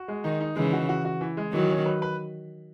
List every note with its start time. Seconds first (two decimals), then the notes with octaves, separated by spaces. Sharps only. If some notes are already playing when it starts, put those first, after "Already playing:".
Already playing: F#4
0.08 G#3
0.24 D#3 D#4
0.40 D#4
0.56 C#3 E3 G#3
0.73 F#4
0.89 F#4
1.05 F#4
1.21 E3
1.37 G#3
1.53 D#3 E3 F#3
1.70 C#4
1.86 B4
2.02 B4